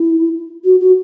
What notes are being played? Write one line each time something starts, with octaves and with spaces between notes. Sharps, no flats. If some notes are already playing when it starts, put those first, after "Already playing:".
Already playing: E4
F#4
F#4